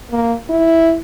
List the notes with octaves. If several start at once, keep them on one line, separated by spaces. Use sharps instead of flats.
A#3
E4